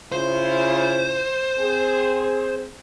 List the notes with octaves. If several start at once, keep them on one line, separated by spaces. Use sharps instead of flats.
C#3 E4 F4 C5
C4 G#4